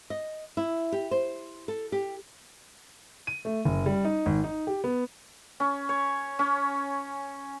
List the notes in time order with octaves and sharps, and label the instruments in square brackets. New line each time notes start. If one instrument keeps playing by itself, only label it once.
[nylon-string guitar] D#5
E4
G4
C5
A4
G4
[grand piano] D#7
A3
F#1
G3
D#4
G#1
D#4
G4
B3
[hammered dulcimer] C#4
C#5
C#4